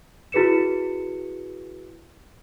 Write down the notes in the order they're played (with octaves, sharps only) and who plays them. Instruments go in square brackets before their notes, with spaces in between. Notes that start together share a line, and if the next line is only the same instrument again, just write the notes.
[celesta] E4 F#4 G#4 B4 C#7 E7